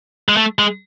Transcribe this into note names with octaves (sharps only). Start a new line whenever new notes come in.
G#3
A3
G#3